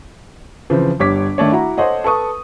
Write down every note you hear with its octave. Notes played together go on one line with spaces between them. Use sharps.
C#3 E3 F3 C4
G1 G3 C#5 D6 B6
D#3 A3 D4 C#5
E4 F#4 A#5
A4 C5 C#5 D#5 F#5
A4 B4 C#6 D#6